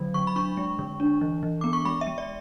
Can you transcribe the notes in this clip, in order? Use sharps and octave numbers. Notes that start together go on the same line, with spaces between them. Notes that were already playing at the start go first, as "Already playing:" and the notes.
Already playing: D3 F#3
D3 C#6
B5
D4 C#6
G#3
D3
D4
E3
E3
B3 D6
C#6
G#3 B5
E5
G#3
D5